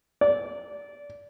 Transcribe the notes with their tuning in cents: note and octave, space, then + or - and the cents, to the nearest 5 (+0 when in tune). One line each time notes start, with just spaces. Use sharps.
D5 -20